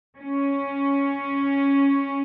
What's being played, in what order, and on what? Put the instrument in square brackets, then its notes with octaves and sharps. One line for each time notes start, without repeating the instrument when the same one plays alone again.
[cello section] C#4